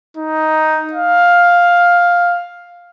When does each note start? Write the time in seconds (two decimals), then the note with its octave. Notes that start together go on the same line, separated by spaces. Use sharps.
0.17 D#4
0.93 F5